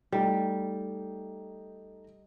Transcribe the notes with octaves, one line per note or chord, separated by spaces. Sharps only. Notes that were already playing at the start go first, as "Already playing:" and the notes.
G3 A3 D#4